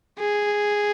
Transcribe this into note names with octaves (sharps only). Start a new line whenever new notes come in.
G#4